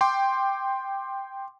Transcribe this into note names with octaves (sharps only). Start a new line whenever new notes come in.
G5 C6 D6